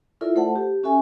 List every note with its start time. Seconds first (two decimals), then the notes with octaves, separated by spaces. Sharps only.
0.21 E4 F4 A4 A#4 D5 E5
0.35 A3 A4 C5 F#5 A5
0.56 G4
0.83 C#4 F#4 A4 E5 G#5